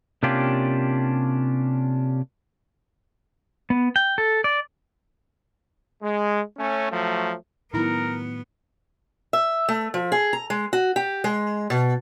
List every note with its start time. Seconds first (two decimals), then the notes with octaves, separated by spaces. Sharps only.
0.23 C3 A#3 C#4 D4 F4 G4
3.70 B3
3.96 G5
4.18 A4
4.44 D5
6.02 G#3
6.57 A3 C#4
6.90 F3 F#3 A3
7.73 A2 D#3 F#3 B3 D#4 E4 A#4 A#5
9.33 E5
9.68 A3
9.94 F3
10.12 G#4
10.33 A#5
10.50 G#3
10.73 F#4
10.96 G4
11.24 G#3
11.70 B2